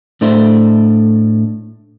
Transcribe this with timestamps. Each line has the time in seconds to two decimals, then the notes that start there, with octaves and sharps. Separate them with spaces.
0.21 A2 A3 D4 E4 C5